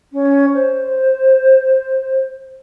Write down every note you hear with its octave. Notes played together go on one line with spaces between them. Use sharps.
C#4
C5